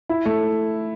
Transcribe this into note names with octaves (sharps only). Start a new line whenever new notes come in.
E4
A3